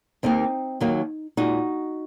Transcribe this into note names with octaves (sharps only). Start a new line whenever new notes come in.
D#2 D#3 A#3 C4 D#4
D#2 D#3 F#3 A#3
A#2 G#3 D#4 F#4